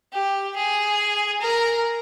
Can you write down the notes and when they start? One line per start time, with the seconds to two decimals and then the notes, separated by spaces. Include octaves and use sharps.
0.13 G4
0.55 G#4
1.41 A#4